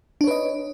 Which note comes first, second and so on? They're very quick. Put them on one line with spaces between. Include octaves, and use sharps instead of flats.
D4 C#5 B4 D#5